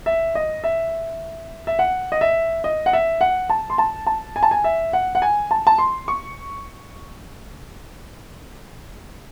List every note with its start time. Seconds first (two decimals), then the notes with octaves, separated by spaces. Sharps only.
0.06 E5
0.35 D#5
0.64 E5
1.67 E5
1.79 F#5
2.12 D#5
2.21 E5
2.64 D#5
2.86 F#5
2.93 E5
3.21 F#5
3.50 A5
3.70 C6
3.78 A5
4.07 A5
4.36 G#5
4.43 A5
4.51 G#5
4.64 E5
4.93 F#5
5.15 F#5
5.22 G#5
5.51 A5
5.67 A5
5.78 C6
6.08 C#6